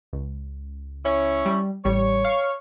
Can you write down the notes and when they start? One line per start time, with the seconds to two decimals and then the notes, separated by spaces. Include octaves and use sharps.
0.13 C#2
1.06 C#4 E4 C#5
1.46 G3
1.85 A1 G3 C#5
2.25 F5 C#6